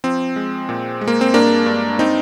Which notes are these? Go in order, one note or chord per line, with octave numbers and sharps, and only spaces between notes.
F3 C4
G#3
A#2
G#3
A#3
C4
G2 A#3 D4
G2
C4 D#4